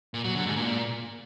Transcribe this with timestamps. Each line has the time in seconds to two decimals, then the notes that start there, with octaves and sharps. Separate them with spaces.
0.14 A#2
0.24 F#3
0.35 D3
0.46 G#2
0.56 A#2